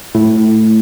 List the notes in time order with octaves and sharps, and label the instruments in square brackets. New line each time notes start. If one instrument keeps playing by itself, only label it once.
[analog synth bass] A2